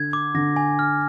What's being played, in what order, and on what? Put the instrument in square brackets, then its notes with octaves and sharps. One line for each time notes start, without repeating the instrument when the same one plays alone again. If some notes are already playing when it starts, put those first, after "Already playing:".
Already playing: [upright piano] D3 [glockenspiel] G#6
[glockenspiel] D6
[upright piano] D3 [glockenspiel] A#6
[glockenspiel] G#5
F6